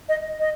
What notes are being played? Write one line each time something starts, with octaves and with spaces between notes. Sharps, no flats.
D#5
D#5